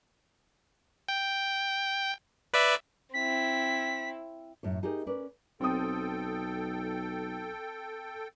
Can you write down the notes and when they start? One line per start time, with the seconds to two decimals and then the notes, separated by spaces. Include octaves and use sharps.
1.08 G5
2.54 B4 D5 E5
3.14 C4 E4 B6
4.63 F#2 A2 C#5
4.83 D#4 G4 G#4 A#4 D#5
5.06 C#4 A#4 B4 D5
5.61 B1 C4 A4 G5 D#6